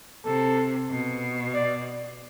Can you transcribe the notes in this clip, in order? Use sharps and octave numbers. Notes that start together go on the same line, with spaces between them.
C3 A4
B2
D5